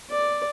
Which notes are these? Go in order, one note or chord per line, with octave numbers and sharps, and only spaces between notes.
D5